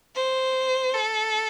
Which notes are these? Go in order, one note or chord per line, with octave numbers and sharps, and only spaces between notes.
C5
A4